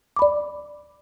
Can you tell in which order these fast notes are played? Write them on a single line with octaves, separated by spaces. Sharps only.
D6 B5 D5